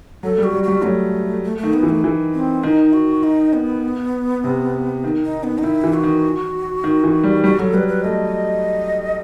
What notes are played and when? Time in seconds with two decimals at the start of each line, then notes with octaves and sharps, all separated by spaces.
0.23 F#3 A4
0.38 G3
0.43 F#4
0.53 G3
0.64 G3 F#4
0.83 F#3 A3
1.44 A3
1.58 A3
1.64 D#3
1.73 B3
1.83 E3
1.89 A3
2.04 E3
2.34 C4
2.63 D#3 D#4
2.93 F#4
3.23 D#4
3.53 B3
4.44 C3
5.04 D#3
5.24 D#4
5.44 B3
5.58 D#4
5.63 D#3 E4
5.84 E3
5.94 F#4
6.03 D#3
6.84 D#3
7.04 E3
7.24 G3
7.44 G3 F#4
7.59 F#3 A4
7.73 G3 B4
7.88 B4
8.03 A3 D#5